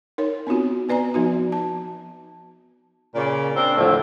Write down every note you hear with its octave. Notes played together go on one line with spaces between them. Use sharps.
D#4 A#4 C#5
B3 C4 D#4 F4 F#4
B3 B4 D5 G#5 A#5
F3 B3 D#4 F#4
A5
A#2 C#3 D5
A#3 C4 D4
D#2 A2 D3 F3